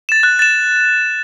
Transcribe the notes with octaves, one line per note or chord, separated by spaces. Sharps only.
A6 E7
F#6
A6 E7